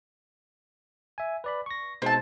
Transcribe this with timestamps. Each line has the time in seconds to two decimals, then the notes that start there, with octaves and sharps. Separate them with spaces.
1.18 E5 G#5
1.44 B4 D5 B5
1.66 C#6 A#6
2.02 B2 G#3 C4 D#4 A5